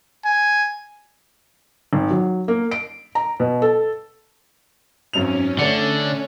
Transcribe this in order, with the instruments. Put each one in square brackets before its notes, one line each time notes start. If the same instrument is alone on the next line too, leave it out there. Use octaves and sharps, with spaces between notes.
[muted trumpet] G#5
[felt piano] G#1
F#3
A#3
D7
A#5
B2
A4
[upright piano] G#1 F#2 F7 [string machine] C#4
[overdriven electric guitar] D3 [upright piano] A3 D5 C#7